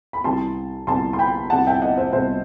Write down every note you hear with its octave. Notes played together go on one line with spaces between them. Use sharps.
B5
C2 C3 E3 A5 C6
C2 C3 E3 A5 C6
C6
G5 B5
C2 C3 E3 F#5 A5
E5 G5
D#5 F#5
C5 E5
C2 C3 E3 C5 E5